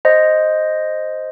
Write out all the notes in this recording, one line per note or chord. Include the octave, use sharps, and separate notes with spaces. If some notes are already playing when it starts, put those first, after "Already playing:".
C5 D#5